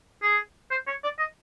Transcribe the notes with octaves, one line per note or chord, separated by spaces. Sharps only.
G#4
C5
C#5
D5
D#5